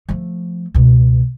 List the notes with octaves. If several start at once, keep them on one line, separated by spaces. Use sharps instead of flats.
F3 A3
C#2 B2